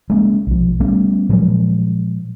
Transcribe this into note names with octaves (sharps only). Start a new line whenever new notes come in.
G#3 A#3 C#4
B1 F3
G3 A3 B3 C#4
A#2 F3 F#3 G#3